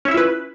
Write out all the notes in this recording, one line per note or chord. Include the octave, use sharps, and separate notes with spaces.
C#4 E4 F4 B4 E5